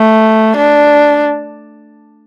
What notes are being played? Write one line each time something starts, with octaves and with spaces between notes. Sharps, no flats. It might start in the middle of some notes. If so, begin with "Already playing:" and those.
Already playing: A3
D4